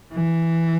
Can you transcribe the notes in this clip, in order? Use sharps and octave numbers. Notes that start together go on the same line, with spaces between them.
E3